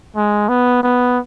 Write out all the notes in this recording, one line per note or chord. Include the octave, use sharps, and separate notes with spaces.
G#3
B3
B3